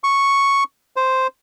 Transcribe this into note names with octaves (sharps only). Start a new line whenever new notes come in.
C#6
C5